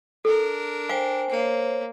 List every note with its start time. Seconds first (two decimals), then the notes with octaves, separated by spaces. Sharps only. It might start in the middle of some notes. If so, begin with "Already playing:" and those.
0.25 D4 A4 A#4
0.89 C5 F5 G5 G#5
1.30 A#3 C5 C#5